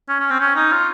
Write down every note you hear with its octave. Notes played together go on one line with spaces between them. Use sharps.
C#4
C#4
C4
C#4
D#4
F4